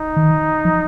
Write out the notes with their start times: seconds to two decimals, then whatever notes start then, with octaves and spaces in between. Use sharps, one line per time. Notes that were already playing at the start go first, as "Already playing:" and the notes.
Already playing: D#4
0.16 D#3
0.65 F3